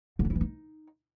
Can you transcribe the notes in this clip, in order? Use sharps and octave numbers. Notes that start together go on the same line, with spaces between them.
D3
D4
E4
E3
D#4